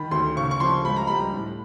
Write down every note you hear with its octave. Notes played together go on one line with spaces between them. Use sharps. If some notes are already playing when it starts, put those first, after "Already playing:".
Already playing: D#3 B5
D2 C6
C#3 C#6
C#6
F3 C6
C#2 B5
A#5
G3 B5
A2